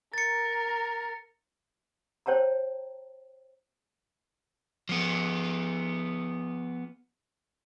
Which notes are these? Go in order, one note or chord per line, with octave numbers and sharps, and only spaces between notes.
A#4 A6 C#7
C5 C#5 G5 A5 A#5
F3 B3